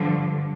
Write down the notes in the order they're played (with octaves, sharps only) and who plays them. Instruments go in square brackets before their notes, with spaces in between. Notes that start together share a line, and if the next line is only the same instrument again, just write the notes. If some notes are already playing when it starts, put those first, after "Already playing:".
Already playing: [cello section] G2 D3 F3